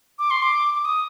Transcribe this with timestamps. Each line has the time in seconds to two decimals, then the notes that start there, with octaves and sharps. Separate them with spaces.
0.19 D6
0.30 C6
0.43 D6
0.74 D6
0.85 D#6